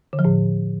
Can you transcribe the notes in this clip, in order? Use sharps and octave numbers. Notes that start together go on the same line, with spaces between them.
D3
F3
A2